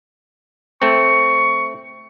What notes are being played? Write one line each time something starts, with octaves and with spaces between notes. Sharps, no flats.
A3 C4 C#6